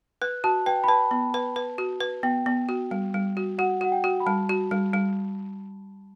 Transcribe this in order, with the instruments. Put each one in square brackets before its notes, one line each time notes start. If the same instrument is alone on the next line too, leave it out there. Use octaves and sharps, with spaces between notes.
[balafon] B4 [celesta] F#6
[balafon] F#4 [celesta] A5
[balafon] B4 [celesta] G5
[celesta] B5
[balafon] B4 [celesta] A5
[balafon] B3
B4
B4
F#4
B4
[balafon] B3 [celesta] G5
[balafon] B3
F#4
G3
G3
F#4
[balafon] F#4 [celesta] F#5
[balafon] F#4 [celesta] F#5
[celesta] G5
[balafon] F#4
[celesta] B5
[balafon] G3 [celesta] A5
[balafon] F#4
G3
G3